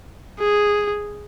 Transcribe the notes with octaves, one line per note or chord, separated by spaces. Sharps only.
G#4